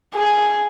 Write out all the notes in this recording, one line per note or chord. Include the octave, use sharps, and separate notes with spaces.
G#4